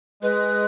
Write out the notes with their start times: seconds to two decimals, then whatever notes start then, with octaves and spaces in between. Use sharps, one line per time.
0.22 G#3 B4